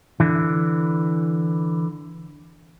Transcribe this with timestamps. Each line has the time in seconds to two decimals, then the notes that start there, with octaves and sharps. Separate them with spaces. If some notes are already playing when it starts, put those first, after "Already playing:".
0.20 D3 E3